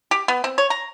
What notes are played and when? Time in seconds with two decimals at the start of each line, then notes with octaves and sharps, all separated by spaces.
0.11 G4
0.28 B3
0.44 C4
0.58 C#5
0.70 A#5